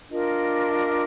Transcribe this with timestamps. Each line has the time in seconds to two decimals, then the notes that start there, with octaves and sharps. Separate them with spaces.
0.10 D4 F4 A#4 D#5